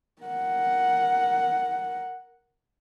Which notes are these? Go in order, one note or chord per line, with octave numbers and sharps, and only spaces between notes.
A#4 F#5